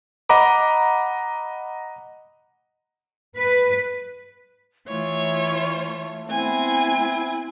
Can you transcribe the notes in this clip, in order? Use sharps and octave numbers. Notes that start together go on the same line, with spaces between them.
D#5 F#5 A#5 B5 D6
B4
E3 A3 F4 C#5
B3 C4 E4 F#5 G#5